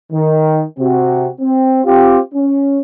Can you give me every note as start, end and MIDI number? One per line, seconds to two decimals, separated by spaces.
0.12 0.63 51
0.79 1.27 48
0.79 1.27 60
0.79 1.27 66
1.41 1.81 60
1.85 2.18 60
1.85 2.18 65
1.85 2.18 67
2.34 2.81 61